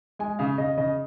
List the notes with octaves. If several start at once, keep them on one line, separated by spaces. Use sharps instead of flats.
G#3 G#5
C#3 F5
C#3 D#5
C#3 D#5